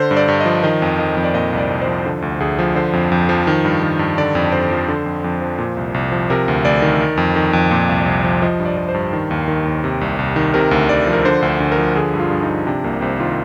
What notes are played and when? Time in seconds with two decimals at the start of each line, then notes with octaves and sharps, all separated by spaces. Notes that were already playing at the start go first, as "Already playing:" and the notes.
Already playing: D3 C5
0.11 G2
0.17 D5
0.28 G2
0.41 F3 D#5
0.63 D#3 D#5
0.82 F2
0.99 D#3 D#5
1.17 F2
1.24 D5
1.34 A#2 D#5
1.53 C2 D5
1.70 C2
1.82 C5
1.87 F3
2.06 D3
2.22 D2
2.40 D2 G#4
2.59 F3
2.75 D3 C5
2.93 F2
3.12 F2
3.29 F3
3.47 D#3
3.65 G2
3.83 D#3
3.99 G2
4.18 D3 D5
4.35 F2
4.52 F2 C5
4.71 F3
4.88 D3
5.06 F2
5.24 F2
5.41 F3
5.59 A#2
5.77 C2
5.94 C2
6.12 F3
6.30 C3 A#4
6.48 D2
6.65 D2 D5
6.82 D#3
7.01 D#3
7.17 F2
7.36 D#3
7.53 F2
7.71 A#2
7.89 C2
8.06 C2
8.24 F3
8.42 F3 D#5
8.60 G2
8.65 D5
8.77 F3
8.89 C5
8.94 G2
9.13 D#3
9.31 D#2
9.48 D#3
9.65 D#2
9.84 C3
10.01 C2
10.19 C2
10.36 D#3
10.54 C3 A#4
10.71 D2
10.89 D2 D5
11.07 F3
11.13 A#4
11.25 D3 C5
11.42 D2
11.49 C5
11.60 D2
11.72 A#4
11.78 F3
11.95 D3 G#4
12.14 G2
12.20 F4
12.31 G2
12.43 D#4
12.49 F3
12.67 C3 D4
12.84 C2 A#3
13.01 C2 C4
13.20 D#3 F4